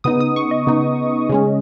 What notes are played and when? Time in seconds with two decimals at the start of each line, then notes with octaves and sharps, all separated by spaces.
0.04 C#3 B3 D#4 D#6
0.20 D#6
0.36 C#6
0.51 D#5
0.67 C#3 B3 D#4
1.29 C#3 G#3 C#4